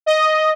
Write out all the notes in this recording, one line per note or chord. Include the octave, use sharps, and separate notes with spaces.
D#5